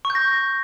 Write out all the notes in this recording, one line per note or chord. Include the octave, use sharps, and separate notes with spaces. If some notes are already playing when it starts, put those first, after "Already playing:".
C#6
G6
A#6